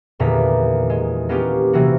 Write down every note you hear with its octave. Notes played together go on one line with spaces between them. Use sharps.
D#1 E2 A#2 D3 A#5 B6
G#3
A#3 B3 C#4 F4 G4
C3 E3 F#3 A#3 F#4